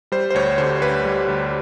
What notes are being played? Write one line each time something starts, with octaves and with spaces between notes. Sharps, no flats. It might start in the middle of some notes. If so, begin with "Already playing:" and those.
G3 C5
C5
D2 C#5
D3 C5
D2 B4
G3
D2